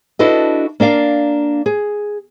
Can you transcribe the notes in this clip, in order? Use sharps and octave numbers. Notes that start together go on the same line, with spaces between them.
D4 E4 F#4 A4 B4 D#5
A#3 D4 D5 F5
G#4